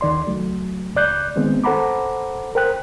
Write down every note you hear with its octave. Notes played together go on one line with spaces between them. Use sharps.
D#2 D#3 D5 C6
C#2 F#3 A3
C#2 D5 F#6 G6
D#3 G#3 B3 C4
A4 C5 F#5 A#5 B5 D6
A#4 C5 G5 F#6